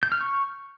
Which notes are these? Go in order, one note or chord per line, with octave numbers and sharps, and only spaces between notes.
G6
F6
C#6